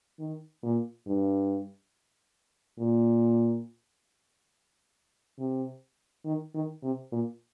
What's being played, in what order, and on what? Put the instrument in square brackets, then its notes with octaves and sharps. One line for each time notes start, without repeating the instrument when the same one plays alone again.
[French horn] D#3
A#2
G2
A#2
C3
D#3
D#3
C3
A#2